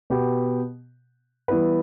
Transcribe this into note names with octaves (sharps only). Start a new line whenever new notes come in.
B2 B3 G4
E3 G3 B3 E4 B4